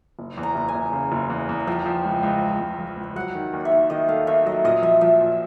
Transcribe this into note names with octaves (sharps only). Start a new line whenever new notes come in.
F#1
E2
A#5
F#1
G#5
F#1
C#3
F#1
E2
E2
F3 G5
F3
C#2
C#2
F3
C#2
F3
C#2
F#3 F#5
D#3
D#2
E5
D#2
D#3 D#5
A3 F5
D#2 E5
F#3 D#5
A#2 D#5
F3 E5
F3 E5
A#2